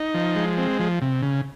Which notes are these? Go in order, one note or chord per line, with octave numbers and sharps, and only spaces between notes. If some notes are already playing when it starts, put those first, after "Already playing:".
Already playing: D#4
F3
G#3
C4
F3
C3
C#3